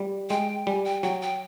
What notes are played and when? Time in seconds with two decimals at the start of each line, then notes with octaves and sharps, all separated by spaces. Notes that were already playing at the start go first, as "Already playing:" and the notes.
Already playing: G3
0.30 G#3 G5
0.67 G3 G#5
0.85 G5
1.03 F#3 G5
1.22 G5